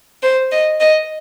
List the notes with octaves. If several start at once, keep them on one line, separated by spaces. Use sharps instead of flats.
C5
D#5
D#5